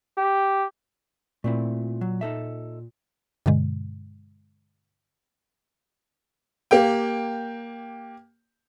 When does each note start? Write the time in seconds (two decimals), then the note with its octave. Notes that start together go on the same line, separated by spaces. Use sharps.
0.18 G4
1.44 A#2 A3 C4 E4
2.01 F#3
2.21 D#4 A4 E5
3.46 G2 B2 D3 G#3
6.71 A#3 G4 G5